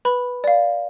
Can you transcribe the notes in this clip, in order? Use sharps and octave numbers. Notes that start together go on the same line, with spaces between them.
B4 B5
D5 F5